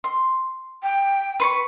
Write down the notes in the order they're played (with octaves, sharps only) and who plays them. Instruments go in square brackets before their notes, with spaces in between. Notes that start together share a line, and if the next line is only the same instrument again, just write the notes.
[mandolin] C6
[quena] G5
[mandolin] B4 C6 C#6